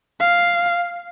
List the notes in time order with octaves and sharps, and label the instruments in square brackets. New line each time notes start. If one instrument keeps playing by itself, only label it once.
[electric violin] F5